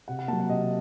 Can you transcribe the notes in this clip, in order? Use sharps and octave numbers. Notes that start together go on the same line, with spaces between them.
C3 F#5
F#5
F#3 A#3 A5
F#5
C3 D#5